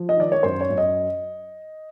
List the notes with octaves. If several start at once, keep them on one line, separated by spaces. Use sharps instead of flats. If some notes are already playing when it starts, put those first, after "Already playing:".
Already playing: F3
D#5
D#3 D5
C#5
F#2 C5
C#5
F#2
D#5